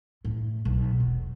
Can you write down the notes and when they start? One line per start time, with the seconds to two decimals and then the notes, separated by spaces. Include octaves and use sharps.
0.25 A2
0.65 B1
1.00 E1